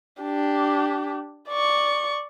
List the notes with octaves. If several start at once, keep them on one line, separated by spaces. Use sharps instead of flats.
D4 G4
D5 C#6